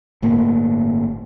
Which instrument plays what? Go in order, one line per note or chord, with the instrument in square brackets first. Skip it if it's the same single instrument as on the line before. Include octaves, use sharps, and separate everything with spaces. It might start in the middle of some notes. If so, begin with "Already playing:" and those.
[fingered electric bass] G1 A2 A#3